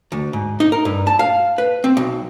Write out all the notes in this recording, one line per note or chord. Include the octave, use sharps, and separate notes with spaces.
D2
G#2
D#4
A#4
G2
A5
F5
B4
C4
B1